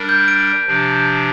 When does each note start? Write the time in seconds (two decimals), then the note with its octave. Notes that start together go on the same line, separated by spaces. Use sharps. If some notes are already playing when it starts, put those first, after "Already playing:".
Already playing: G3 D4 A#4
0.09 G6
0.28 D7
0.67 C3 F3 D4